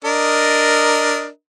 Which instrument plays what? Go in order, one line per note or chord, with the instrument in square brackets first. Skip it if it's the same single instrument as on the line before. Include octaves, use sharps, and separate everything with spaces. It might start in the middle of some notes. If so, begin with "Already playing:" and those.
[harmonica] D4 A#4 D#5